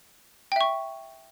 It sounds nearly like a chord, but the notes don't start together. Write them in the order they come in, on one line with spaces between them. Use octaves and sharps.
G5 E5 C#6